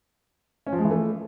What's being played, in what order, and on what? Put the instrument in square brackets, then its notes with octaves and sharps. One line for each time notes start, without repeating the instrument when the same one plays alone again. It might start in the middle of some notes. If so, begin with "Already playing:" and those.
[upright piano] C#4
F3
G#3
E3
A3